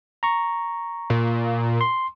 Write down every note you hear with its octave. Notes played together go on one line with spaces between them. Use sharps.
A#5 C#6
A#2
C6